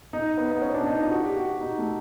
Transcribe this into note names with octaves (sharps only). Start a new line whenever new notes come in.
D#4
B3
B3
C#4
D4
D#4
F4
F#4
G4
F#4
D#4
A3